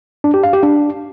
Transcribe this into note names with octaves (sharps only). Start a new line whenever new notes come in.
D4
G4
F5
G4
D4